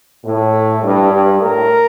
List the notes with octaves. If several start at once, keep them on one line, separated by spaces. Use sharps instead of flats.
A2
G2
G2
A2 A#4